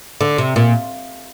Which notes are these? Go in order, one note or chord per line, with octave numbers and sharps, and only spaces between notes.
D3
C3
A#2